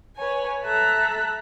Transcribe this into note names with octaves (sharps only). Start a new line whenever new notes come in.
B4 C#5 G#5
A4 E5 A#5 E6 F#6